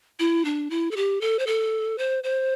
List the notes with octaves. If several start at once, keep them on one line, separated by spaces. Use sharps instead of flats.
E4
D4
E4
A4
G4
A4
C5
A4
C5
C5